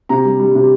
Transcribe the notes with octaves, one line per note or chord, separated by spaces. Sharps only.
C3 A#5
G3
G3
C3